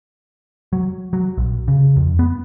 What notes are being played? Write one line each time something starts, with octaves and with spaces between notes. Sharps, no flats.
F#3
F#3
A#1
C#3
F2
B3